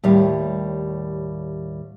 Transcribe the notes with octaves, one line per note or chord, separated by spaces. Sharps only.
D#2 A2 G3